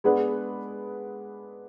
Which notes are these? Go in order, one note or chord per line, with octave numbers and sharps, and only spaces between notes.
G#3 B3 D4 G#4 B4